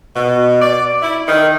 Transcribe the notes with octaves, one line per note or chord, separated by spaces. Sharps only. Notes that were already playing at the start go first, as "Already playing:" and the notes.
B2
D5
E4
D#3